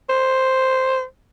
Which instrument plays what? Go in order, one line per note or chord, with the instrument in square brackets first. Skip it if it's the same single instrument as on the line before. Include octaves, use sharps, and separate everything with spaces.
[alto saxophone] C5